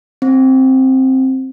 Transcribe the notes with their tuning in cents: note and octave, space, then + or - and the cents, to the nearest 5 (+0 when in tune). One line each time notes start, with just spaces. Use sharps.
C4 +5